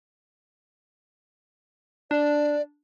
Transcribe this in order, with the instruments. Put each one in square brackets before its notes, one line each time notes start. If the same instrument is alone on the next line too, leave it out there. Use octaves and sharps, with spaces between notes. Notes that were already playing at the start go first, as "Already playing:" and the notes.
[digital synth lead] D4 [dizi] D5